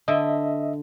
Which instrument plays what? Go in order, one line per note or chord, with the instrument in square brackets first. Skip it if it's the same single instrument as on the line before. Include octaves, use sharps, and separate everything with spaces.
[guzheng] D3 [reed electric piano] D#5 E5